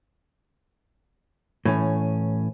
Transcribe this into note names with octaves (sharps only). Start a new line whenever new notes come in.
A2 E3 C#4